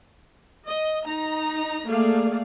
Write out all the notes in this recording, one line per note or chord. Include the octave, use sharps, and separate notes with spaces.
D#5
D#4 A#5
A3 A#3 G#4 D5 F5